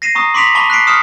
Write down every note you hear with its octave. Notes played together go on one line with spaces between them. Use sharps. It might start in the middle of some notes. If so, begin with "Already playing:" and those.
A#6 C7 D#7 E7
A#5 C#6 D#6
C6 D6 B6 D7 F7 F#7
A5 B5 C#6 D6 G7
F#6 B6 C7 D7
C#6 D#6 F6 C#7 E7